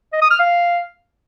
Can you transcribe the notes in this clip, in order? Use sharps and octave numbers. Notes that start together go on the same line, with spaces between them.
D#5
D#6
F6
F5